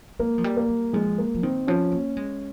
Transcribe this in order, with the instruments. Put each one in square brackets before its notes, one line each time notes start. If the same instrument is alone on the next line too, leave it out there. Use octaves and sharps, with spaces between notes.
[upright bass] G#3 [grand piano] A#3
[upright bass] F3
G3
[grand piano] A#3
[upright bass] G3
[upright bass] F3 [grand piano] G#3
[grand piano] A#3
[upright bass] F3
[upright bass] D#3 [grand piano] C4
[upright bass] F3 [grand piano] C#4
[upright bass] A#3
G#3